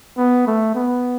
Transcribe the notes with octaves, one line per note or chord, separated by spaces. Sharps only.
B3
A3
B3